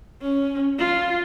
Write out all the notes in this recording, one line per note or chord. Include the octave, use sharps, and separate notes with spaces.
C#4
F4